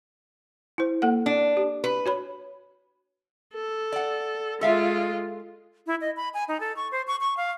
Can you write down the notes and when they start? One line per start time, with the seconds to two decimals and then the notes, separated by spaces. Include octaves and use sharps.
0.78 E4 C5
1.02 A#3 A4 F#5
1.26 D4
1.57 G4
1.84 B4
2.06 F#4 C#5 B5
3.54 A4
3.92 D5 F#5
4.61 G#3 F4 A4 E5 F5
5.87 E4
6.01 D#5
6.17 B5
6.34 G#5
6.48 D#4
6.60 A4
6.76 C#6
6.92 C5
7.08 C#6
7.21 C#6
7.37 F5